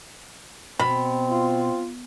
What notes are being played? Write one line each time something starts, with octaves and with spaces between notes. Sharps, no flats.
B2 C4 B5
F4